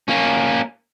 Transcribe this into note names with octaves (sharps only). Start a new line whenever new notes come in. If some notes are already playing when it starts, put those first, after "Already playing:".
A#3 C#4